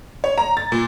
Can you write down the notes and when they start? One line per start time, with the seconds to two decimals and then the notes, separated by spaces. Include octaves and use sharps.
0.24 C#5
0.38 A#5
0.57 A6
0.72 A#2